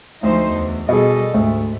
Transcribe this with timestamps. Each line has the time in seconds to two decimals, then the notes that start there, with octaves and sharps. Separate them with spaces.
0.23 D2 F3 D#4 C5
0.51 E2
0.89 B2 G3 G#4 A4 D#5
1.34 D2 G#2 A3